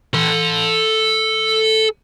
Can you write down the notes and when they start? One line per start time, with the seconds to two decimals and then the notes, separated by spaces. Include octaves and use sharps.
0.15 A4 C6